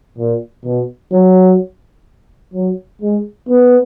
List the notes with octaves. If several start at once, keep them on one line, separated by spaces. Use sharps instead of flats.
A#2
B2
F#3
F#3
G#3
B3